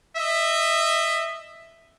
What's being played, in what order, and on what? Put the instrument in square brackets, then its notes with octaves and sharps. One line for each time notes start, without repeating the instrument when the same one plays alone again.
[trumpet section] D#5 E5